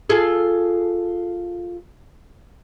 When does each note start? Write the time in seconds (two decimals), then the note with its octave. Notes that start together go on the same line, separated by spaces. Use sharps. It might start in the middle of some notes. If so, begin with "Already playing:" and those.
0.10 F4 G#4 A4